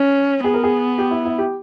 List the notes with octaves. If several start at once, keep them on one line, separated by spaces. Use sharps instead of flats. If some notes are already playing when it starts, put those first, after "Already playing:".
Already playing: C#4
B3 G#4
A#4
G#4
G4
E4
E4
G4